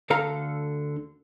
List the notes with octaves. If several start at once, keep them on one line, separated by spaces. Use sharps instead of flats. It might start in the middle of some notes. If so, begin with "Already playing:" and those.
D2 D3 A4 F5 A#5